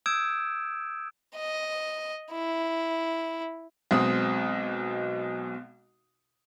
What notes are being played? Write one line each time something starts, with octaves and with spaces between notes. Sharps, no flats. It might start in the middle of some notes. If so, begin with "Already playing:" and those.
D#6 E6 G6 G#6 D7 E7
D#5
E4
B1 B2 G#3 C4 D#5 D#6